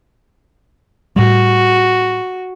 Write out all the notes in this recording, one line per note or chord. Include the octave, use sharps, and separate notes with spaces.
A2 G3 F#4